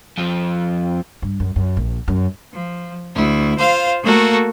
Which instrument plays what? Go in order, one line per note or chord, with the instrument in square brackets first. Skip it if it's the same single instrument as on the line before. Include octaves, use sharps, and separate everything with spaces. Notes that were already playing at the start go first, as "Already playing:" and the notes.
[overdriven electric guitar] F2 F3
[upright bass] G2
F#2
F#2
A#1
F#2
[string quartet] F3
D2 E4
F4 C5 F5
A3 A#3 F#4 A4 A#4